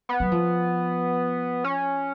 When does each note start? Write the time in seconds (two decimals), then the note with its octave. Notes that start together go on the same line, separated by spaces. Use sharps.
0.09 B3
0.20 F#3
0.32 F3
1.64 C#4